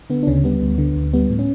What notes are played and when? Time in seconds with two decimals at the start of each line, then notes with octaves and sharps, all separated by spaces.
0.10 D3 B3
0.23 D4
0.27 D2 C#3 C#4
0.44 G3 B3
0.62 D2
0.78 D3
0.96 D2
1.13 G3 B3
1.30 A2
1.39 C#4